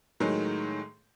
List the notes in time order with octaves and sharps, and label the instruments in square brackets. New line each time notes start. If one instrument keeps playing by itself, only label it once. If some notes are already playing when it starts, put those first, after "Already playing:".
[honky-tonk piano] A2 D#3 F#3 G#3